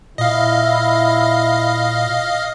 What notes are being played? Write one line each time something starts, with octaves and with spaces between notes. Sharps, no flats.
A#2 E4 D#5 F5